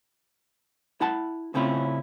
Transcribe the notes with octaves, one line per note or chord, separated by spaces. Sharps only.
E4 F#5 A5
A2 C#3 C4 C#4 E4 F4